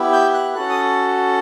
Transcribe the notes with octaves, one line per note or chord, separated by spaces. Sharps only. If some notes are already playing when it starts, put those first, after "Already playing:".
Already playing: B3 E4 G4
G6
F#6
C#4 F#4 A4 F#6
D#6